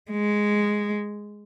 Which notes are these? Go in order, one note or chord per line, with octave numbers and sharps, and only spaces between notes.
G#3